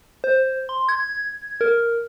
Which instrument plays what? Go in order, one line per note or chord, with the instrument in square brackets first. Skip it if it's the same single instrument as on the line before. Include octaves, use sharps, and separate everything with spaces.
[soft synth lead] C5
C6
G#6
A#4